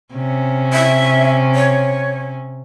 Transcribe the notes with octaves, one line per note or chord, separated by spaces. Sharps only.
C3 C#4
E5
C#5